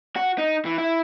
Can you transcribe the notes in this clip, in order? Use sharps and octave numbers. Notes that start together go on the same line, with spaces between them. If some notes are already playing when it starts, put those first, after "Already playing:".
F#4
D#4
E3
E4